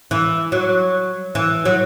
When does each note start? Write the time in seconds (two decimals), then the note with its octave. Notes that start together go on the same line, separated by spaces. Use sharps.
0.11 E3
0.52 F#3
1.35 E3
1.65 F#3